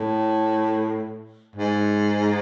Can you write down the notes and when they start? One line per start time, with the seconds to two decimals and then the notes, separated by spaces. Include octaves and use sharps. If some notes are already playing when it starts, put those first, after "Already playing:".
Already playing: A2
1.56 G#2